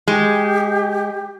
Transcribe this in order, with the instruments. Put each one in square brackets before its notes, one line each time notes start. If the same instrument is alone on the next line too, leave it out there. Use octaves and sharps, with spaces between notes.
[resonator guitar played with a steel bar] G#3 [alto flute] G4